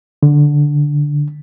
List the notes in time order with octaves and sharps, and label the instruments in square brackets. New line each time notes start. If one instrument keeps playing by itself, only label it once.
[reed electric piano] D3